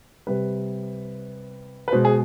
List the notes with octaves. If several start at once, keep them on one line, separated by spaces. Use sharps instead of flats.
C3 G3 B4
B4
B2 G#3 C5
G#4